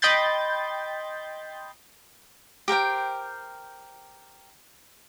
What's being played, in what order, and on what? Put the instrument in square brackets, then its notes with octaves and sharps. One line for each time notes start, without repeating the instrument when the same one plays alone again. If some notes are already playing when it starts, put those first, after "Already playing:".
[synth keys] D#5 G5 B5 C6 G6 A6
[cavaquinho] G4 A#4 C5 G5